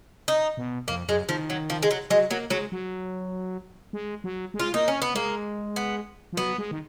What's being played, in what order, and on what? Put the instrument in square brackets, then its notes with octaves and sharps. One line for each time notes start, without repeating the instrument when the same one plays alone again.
[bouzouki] D#4
[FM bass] B2
[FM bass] F2 [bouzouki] A#3
[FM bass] F#2 [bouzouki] G#3
[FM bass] D#3 [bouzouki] F3
[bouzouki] F#3
F3
G#3
F#3
[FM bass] F#3 [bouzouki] G#3
[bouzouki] F#3 [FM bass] A#3
[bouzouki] F#3 [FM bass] G#3
[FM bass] F#3
G#3
F#3
G#3
[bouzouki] F4
[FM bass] A#3 [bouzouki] D#4
[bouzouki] C#4
B3
[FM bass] G#3 [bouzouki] A#3
[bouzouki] B3
[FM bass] F3
[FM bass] F#3 [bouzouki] B3
[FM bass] G#3
D#3